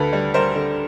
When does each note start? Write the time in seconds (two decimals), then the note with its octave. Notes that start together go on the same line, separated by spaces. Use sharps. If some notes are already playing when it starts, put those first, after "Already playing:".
Already playing: D2 A4 B4
0.13 G3
0.34 G3 A#4 C5
0.55 D3